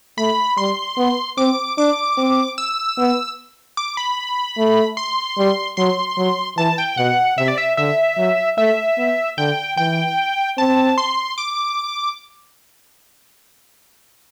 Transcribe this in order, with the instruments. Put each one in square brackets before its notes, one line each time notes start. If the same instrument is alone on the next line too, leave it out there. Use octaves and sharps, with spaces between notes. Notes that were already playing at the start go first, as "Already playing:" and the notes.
[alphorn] A3 [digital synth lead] B5
[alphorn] G3 [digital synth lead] C6
[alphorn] B3
[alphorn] C4 [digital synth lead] D6
[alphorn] D4 [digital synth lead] D6
[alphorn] C4
[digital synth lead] E6
[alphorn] B3
[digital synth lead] D6
B5
[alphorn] A3
[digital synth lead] C6
[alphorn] G3
[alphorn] F#3 [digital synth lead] C6
[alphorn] F#3
[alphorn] E3 [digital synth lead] A5
[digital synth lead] G5
[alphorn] B2 [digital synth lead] F#5
[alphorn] C3 [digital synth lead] E5
[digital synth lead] D5
E5
[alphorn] D3 [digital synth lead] E5
[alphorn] F#3
[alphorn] A3 [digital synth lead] E5
[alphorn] B3
[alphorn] D3 [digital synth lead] G5
[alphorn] E3 [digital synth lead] G5
[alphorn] C4 [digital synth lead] A5
[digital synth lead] C6
D6